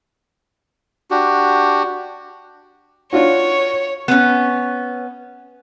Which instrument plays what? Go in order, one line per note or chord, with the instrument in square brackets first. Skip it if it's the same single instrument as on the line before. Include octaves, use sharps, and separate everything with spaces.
[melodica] D4 F#4 G4
[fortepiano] D4 F4 F#4 [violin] C#5
[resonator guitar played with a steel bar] B3 C#4